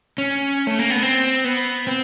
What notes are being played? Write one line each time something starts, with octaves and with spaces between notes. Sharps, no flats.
C#4
A3
A#3
B3
C4
B3
C4